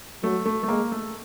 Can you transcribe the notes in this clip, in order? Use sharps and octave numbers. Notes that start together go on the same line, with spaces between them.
F#3 A3
A3
A3
G#3 A#3
A3